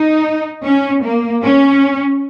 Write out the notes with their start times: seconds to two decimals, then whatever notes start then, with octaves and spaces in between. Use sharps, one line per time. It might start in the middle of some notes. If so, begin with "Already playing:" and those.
Already playing: D#4
0.64 C#4
1.03 A#3
1.43 C#4